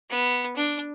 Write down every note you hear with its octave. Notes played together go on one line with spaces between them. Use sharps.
B3
D4